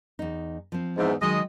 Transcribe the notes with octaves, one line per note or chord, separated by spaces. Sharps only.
E2 D#4
F3 C4
E2 G#2
D#3 F#3 G#3 D#5